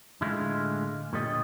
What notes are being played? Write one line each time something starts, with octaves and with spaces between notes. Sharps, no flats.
A2 D3 G#3 E4 F4
A#2 D3 G3 C#5 D#5